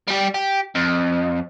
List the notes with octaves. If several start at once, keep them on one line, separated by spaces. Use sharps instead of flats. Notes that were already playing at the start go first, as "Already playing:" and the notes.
G3 G4
G4
F2